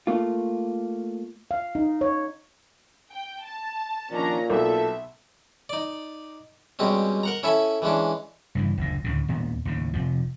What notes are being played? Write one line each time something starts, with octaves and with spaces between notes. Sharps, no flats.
A3 A#3 F4
F5
D#4
C#5
G5
A5
A#2 D#3 F3 C#4 D4 A#5
B1 B2 A4 E5
D#4 D5
B2 G3 G#3 C4 C#4
A#4 F#5 A#5
C#4 E4 A4 E5 G#5
E3 G#3 C#4 D4
G2 C#3 E3
F#1 D2 A#2
D2 A2 C#3
D#2 A#2 B3
D#2 A2 C#3
F1 C3 F3